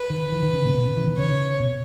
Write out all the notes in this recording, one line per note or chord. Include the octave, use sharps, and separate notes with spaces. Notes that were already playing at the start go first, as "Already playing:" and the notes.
Already playing: B4
D#3
E3
D#3
C#3
A#2
B2
C#3
E3
D#3
C#3 C#5
B2